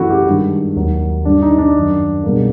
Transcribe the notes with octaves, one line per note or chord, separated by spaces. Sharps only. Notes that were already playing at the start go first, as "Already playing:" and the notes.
Already playing: F#2 C#3 E3 A3 E4 F#4
G4
G2 D#3 G#3
D#2 D#3 F#3
G2 D3 G3 D4
D#4
D4
F#2 D#3 F#3
C#2 B2 G3 A#3